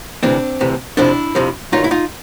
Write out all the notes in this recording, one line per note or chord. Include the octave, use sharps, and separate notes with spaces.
D2 C3 E3 C4 D4
D2 C3 E3
F2 C3 F3 D4 E4
F2 C3 F3
G2 D#3 F#3 D#4 F4
E4
D#4 F4